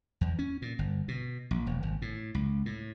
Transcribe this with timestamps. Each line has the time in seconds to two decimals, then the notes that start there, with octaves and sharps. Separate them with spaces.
0.21 E2
0.39 C#4
0.62 A#2
0.79 G1
1.08 B2
1.51 A#1
1.67 E1
1.83 G#1
2.02 A2
2.35 C#2
2.66 A2